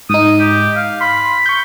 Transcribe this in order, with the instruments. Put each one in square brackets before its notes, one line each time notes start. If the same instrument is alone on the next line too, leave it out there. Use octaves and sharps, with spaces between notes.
[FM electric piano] G#2 D#4 [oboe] D#6
[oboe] G4
F5
[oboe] B5 [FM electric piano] C6
[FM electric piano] C#6 G6